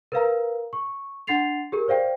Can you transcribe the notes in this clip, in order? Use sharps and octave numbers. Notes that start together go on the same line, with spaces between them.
A#4 B4 F5 A#5
C#6
D4 F#5 C6 A6 C7 F7
G4 G#4 A#4
C5 D5 F5 G5